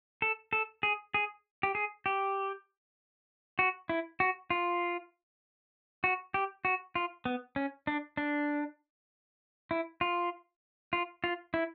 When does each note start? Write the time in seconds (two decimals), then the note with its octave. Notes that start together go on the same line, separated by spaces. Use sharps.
0.22 A4
0.53 A4
0.83 G#4
1.14 G#4
1.63 G4
1.75 G#4
2.06 G4
3.59 F#4
3.89 E4
4.20 F#4
4.50 F4
6.04 F#4
6.34 G4
6.65 F#4
6.95 F4
7.25 B3
7.56 C#4
7.87 D4
8.17 D4
9.71 E4
10.01 F4
10.93 F4
11.24 F4
11.54 E4